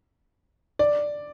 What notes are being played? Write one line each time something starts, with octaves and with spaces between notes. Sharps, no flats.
D5